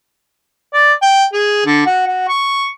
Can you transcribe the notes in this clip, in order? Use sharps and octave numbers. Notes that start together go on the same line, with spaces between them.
D5
G5
G#4
D3
F#4
F#4
C#6